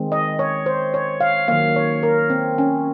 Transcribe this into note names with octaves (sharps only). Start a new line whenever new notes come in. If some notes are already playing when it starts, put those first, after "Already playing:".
Already playing: D#3 G#3 C4
D#5
C#5
C5
C#5
F5
D#3 F#3 A#3 F5
C#5
A#4
C4
C#4